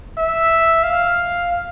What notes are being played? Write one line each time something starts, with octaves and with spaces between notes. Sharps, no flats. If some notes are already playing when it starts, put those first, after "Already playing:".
E5
F5